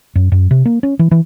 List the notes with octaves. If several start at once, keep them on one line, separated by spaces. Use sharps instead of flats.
F#2
F#2
C3
A#3
C#4
E3
E3